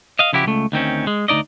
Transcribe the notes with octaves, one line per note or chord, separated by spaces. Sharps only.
D#5 F5
C#3 F3 E4 F#4 G4
C#2 A3
D2 D#3 C4 C#4
G#3
D2 B2 D#4 D5 D#5